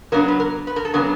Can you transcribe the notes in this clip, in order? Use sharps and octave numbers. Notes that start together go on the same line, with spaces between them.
C#3 F#3 B3 D4 A#4
B4
A#4
B4
A#4
A4
C#3 F#3 B3 D4 A#4